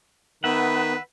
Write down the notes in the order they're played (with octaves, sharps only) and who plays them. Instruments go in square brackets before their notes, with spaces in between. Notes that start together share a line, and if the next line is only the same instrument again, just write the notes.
[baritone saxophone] D#3 [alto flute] B3 [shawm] B4 [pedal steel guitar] E5 F#5